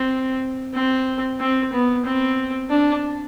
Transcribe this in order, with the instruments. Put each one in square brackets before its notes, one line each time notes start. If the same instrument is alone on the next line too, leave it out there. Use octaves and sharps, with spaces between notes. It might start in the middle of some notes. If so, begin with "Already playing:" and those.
Already playing: [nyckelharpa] C4
C4
C4
B3
C4
D4